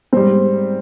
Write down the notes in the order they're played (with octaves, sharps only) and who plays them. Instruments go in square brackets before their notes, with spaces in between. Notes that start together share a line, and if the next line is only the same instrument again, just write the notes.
[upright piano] G#2 G3 C4